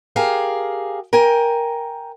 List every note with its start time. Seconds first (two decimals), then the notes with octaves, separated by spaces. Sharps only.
0.16 G4 G#4 A#4 F5
1.13 A#4 G5 G#5